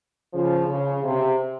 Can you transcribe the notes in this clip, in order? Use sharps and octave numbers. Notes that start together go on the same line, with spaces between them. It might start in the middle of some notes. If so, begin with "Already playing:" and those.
C#3 F3
C#3
C3